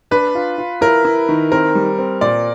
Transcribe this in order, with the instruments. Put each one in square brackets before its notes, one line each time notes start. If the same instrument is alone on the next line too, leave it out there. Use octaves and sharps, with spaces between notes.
[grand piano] D4 [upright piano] B4
[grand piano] F4
F4
[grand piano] E4 [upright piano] A#4
[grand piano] E4
D#3
[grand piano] C4 [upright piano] A#4
[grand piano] G3
C4
[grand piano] A#2 [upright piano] D5